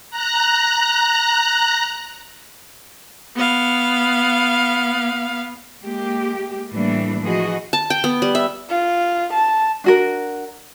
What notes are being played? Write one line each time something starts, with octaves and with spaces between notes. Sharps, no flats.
A#5 F#6
B3 F5
G#3 A#3 G4
A2 E3 G3 A3 A#3 D4
E3 F3 F#4 G#4 D#5
A5
G5
B3
G3
E5
F4
A5
D4 F#4 A#4